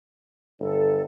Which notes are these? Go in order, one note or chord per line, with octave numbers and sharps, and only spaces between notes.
G1 A4